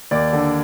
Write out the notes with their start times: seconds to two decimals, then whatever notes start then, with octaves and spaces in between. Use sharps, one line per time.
0.11 D#2 D5
0.33 D3